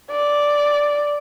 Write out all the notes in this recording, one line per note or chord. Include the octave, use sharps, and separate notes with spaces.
D5